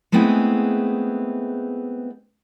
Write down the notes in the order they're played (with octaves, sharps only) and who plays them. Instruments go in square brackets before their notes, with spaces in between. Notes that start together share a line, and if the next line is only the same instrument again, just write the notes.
[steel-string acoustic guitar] G#3 A3 B3 C4 E4 G#4